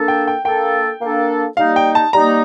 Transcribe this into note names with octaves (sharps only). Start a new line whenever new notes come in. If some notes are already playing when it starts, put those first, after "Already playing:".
Already playing: A#3 D4 A4
G5
G5
A#3 D4 A4 G5
A#3 D4 A4
G3 A#3 D#4 F5
G5
A5
G3 A#3 D#4 A#5